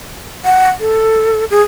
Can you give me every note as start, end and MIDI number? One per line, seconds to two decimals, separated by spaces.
0.45 0.69 78
0.80 1.45 69
1.50 1.62 68